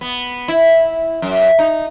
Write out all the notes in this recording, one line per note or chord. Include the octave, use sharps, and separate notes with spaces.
B3
E4
F#2
D#4